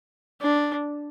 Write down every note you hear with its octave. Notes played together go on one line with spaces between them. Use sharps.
D4